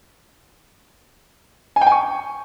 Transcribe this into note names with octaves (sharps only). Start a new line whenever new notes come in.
G#5
G5
G#5
C#6